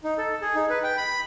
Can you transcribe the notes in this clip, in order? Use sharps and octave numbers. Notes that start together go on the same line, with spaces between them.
D#4
A4
G#4
D#4
B4
G5
B5